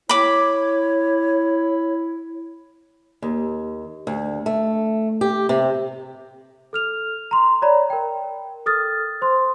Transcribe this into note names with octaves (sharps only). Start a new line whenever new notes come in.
E4 C#5 B5 D6
D#2
D2
A3
G4
C3
A4 F6 F7
A#5 C6
C#5 D5 A#5 B5
A#4 G5
A4 D#6 F6 A6
C5 C6